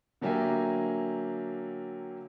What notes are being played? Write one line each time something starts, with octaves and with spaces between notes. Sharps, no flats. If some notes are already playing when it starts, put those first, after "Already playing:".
D3 F#3 A#3 G4 E5 G#5